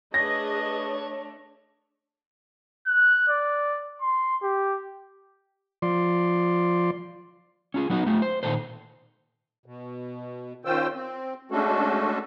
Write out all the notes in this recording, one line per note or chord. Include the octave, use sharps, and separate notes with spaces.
A3 D4 G#4 B4 C#5 D#5 A#6
F#6
D5
C6
G4
F3 D5 C6
C#4 F4 G#4
F#3 B3 D#4 F#4
A3 F4 G4
C5
A#2 D#3 A4 C5
B2
D#3 C#4 F4 C5 G5 E6
C4
G#3 A3 C#4 D4 F#4 A4